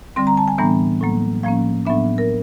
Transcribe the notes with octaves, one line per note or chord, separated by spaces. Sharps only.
D3 G3 C4 C6
A#5
A5
G#5
A2 E3 G3 B3 D4 A#5
A2 F#3 A#3
A2 F3 A#3 C#4 F5
A2 F#3 B3 D4 E5
A#4